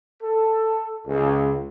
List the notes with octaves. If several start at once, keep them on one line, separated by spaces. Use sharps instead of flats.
A4
C#2